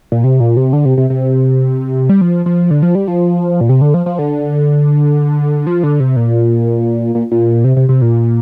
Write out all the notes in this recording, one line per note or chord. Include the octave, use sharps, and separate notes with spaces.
A#2
C3
A#2
C3
D3
C3
C3
C3
G3
F3
F3
D3
F3
G3
F3
A#2
C3
D3
F3
F3
D3
F3
D3
C3
A#2
A#2
A#2
C3
C3
C3
A#2